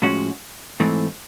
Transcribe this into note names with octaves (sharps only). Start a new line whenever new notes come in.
A2 F3 G#3 C#4 F#4
G#2 E3 A3 C4